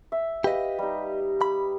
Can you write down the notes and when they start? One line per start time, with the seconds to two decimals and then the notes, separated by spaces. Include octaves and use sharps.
0.12 E5
0.44 G4 B4 D#5 F5
0.79 G3 D#4
1.41 B5